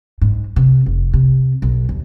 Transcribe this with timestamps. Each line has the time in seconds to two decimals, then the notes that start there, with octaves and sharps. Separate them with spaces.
0.21 G#2
0.56 C3
0.86 F1
1.14 C3
1.62 B1
1.89 D#2